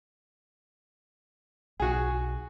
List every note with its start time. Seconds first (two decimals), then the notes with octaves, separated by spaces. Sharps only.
1.80 B1 F#4 G#4